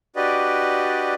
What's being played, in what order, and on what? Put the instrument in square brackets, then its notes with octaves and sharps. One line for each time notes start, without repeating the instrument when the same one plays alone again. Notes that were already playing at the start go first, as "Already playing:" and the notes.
[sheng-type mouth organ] D4 F#4 G4 B4 D5 D#5